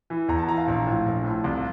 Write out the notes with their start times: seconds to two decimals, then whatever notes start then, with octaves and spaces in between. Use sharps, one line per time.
0.10 E3
0.29 E2 A#5
0.38 A5
0.48 E3 A#5
0.58 F5
0.68 A#1
0.87 A2 F3
1.06 A#1
1.24 A2 F3
1.44 C2 F5